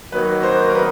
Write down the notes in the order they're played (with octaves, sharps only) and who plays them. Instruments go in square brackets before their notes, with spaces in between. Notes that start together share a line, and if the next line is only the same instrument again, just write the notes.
[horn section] D#3 F#3 A#3 D#4 F#4 [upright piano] B4
[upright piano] C5
A#4
B4